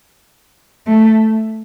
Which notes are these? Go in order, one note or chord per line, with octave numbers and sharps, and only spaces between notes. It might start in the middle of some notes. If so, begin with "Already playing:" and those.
A3